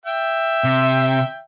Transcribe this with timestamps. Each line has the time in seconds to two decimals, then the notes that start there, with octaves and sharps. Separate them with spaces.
0.06 E5 G5
0.64 C3